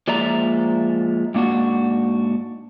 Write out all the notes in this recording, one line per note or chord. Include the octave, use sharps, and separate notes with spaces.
F3 G#3 A#3 D5 E5 A#5
G#2 A#3 D4 F#4